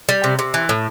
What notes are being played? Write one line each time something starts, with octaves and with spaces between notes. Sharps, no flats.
G3
C3
C3
E3
A2